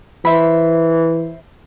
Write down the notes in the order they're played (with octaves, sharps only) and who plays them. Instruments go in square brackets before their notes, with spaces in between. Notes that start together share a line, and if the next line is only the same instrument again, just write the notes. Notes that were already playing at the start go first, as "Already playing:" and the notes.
[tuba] E3 [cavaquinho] C5 E5 B5